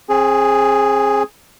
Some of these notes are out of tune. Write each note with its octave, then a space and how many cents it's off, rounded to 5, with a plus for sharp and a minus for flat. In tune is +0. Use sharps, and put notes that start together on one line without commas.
C4 +35 G#4 +0